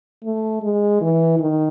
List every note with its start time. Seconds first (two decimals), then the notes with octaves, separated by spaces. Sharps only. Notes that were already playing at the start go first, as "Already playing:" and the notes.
0.24 A3
0.62 G#3
1.01 E3
1.39 D#3